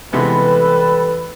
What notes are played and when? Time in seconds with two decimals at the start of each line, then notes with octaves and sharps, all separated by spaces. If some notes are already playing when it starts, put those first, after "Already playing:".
0.13 C3 E3 G3 G#3 B3 A4 B4 B5